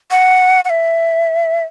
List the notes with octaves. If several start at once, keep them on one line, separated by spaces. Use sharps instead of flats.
F#5
F#5
E5